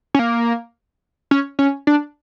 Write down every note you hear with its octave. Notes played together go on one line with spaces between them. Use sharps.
C#4
A#3
C#4
C#4
D4